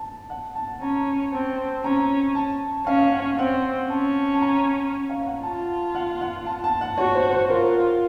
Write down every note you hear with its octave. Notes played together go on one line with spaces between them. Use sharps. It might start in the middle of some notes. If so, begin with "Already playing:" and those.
Already playing: A5
F#5
A5
C#4 A#5
C4 A5
C#4 A#5
A5
C#4 F5
F#5
C4 F#5
C#4 A5
A5
A#5
F5
F#5
F4 A5
F#5
F#5
A5
A5
F#5
F#4 C#5
C5
C5
F4 A#4